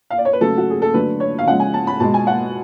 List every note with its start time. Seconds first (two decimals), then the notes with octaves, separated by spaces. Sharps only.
0.10 F5
0.18 D5
0.25 C#5
0.33 B4
0.41 C#3 F#3 A3 A4
0.58 F#4
0.70 G#4
0.82 A4
0.94 D3 F#3 A3 B4
1.20 C#5
1.39 F5
1.46 C#3 F3 G#3 F#5
1.60 G#5
1.74 A5
1.87 B5
2.00 B2 G#3 A5
2.14 G#5
2.27 F#5